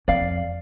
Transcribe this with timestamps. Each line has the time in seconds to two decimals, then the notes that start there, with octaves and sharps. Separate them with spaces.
0.08 F2 D5 F5